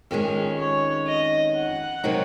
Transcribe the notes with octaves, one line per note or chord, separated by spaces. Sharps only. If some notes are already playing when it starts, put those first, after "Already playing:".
F2 D#3 G#3 C#4
C#5
D#5
F#5
C3 F#3 A#3 D#4